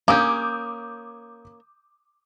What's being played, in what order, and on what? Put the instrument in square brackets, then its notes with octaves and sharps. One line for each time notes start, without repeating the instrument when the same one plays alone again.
[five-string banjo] A#3 C#4 [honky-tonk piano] D6 D#6 G6